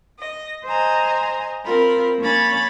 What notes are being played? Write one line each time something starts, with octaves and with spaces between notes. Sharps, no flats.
D#5
C5 D#5 G#5 A#5
C4 F4 A#4 B5
A#3 C#4 C#5 B5 A6